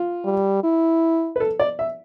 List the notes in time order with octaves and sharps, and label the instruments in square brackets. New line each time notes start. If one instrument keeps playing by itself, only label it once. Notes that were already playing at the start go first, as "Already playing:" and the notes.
Already playing: [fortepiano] F4
[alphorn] G3
E4
[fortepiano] B4
A4
D5
E5